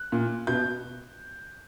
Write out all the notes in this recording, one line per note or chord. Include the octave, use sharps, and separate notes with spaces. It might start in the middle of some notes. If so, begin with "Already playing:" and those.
Already playing: F#6
A#2
B2 G6